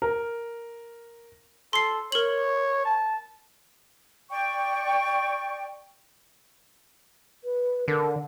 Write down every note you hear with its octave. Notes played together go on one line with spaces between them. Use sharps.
A#4
A4 C6 C7
A#4 C#5 F#7
A5
D5 G5 C#6
B4
D3 A#4